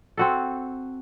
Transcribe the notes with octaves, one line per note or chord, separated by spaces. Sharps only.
C4 F#4 A4